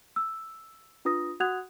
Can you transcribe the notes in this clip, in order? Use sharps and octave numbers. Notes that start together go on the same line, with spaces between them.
E6
D4 F4 B4 D#6 A#6
F#4 F#5 D#6 F#6 G#6 F7